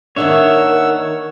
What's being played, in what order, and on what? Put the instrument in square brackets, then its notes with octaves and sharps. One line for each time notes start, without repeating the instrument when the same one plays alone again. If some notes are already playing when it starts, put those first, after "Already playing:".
[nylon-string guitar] D#3 A#3 D4 [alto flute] A#4 [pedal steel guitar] C#5 E5 [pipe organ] F#5 E6